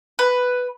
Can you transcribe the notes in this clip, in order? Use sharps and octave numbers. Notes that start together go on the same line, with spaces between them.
B4